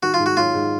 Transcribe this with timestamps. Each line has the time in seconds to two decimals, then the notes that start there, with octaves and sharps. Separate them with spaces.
0.02 D#3 F#4
0.14 F4
0.19 G#2
0.26 F#4
0.37 F#3 F4
0.54 G#2